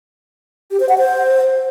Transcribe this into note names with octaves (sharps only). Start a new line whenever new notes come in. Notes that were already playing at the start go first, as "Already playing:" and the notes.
G4
C5
F#5
C5